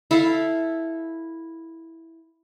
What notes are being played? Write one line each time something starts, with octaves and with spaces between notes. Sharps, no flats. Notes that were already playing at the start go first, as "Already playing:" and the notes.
E4 A4 E5 F5